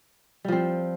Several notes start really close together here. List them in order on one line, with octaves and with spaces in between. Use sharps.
G3 F3 C4